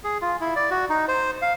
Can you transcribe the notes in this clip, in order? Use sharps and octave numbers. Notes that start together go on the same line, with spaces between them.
G#4
F4
E4
D5
F#4
D#4
C5
F5